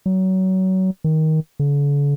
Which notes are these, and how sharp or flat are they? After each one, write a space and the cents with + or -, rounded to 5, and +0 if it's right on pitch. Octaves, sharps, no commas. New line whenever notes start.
F#3 +25
D#3 +15
D3 -45